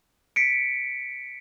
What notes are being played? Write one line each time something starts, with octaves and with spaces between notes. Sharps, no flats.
B6 C#7 D7